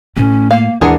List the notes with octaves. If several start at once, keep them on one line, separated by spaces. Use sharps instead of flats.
A2 A3 C#4
A#3 F5
D#2 E3 G#3 D4 G#4 A#4 F#5